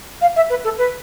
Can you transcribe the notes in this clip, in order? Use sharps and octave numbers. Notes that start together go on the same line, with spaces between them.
F5
E5
B4
A4
B4